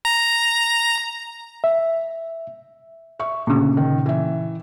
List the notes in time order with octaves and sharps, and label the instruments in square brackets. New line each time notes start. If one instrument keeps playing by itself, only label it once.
[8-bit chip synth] A#5
[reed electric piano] E5
[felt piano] E5 C#6
[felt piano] D2 [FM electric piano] A#2 C#3
[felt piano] D#3
E3 E5